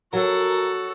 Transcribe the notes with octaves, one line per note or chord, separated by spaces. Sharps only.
F#3 F#4 A4 A#4